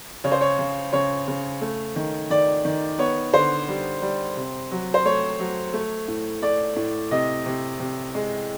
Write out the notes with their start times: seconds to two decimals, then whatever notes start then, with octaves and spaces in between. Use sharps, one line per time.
0.24 C#3 C#5
0.32 C5
0.41 C#5
0.59 C#3
0.93 C#3 C#5
1.28 C#3
1.61 A3
1.96 D#3
2.30 D#3 D5
2.65 D#3
2.98 B3 C#5
3.34 D3 C5
3.68 G3
4.02 G3
4.36 C3
4.71 F#3
4.94 C5
5.05 A3 C#5
5.40 F#3
5.74 A3
6.08 A2
6.42 A3 D5
6.76 A2
7.11 C3 D#5
7.46 C3
7.80 C3
8.15 G#3